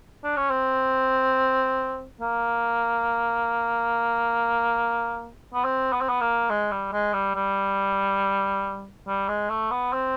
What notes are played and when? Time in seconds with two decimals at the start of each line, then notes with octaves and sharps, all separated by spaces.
0.24 D4
0.36 C#4
0.50 C4
2.21 A#3
5.54 B3
5.64 C4
5.92 B3
6.01 C4
6.09 B3
6.21 A#3
6.50 G#3
6.71 G3
6.92 G#3
7.13 G3
7.35 G3
9.07 G3
9.28 G#3
9.49 A3
9.71 B3
9.93 C4